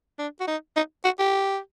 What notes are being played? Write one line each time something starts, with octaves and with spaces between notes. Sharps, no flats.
D4
F#4
D#4
D#4
F#4
G4